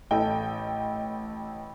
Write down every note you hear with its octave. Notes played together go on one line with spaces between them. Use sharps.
A1 A4 D#5 G5